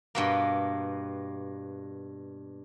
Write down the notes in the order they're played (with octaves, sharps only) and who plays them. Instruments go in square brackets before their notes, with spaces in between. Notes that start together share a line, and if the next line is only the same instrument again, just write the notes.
[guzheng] G2 B2 A#3